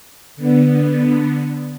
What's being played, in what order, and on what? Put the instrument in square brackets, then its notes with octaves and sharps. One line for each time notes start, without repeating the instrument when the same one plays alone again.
[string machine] D3 B3